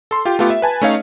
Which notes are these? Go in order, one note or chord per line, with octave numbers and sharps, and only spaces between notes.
A4 C6
F4 G4 G5
A3 B3 F4 G4
E5
B4 G#5 A5
A3 C#4 D#4 C#5 F5